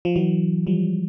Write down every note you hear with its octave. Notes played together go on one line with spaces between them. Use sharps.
F3
E3 F#3
F3 G3